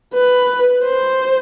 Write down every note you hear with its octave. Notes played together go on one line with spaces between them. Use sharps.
B4
C5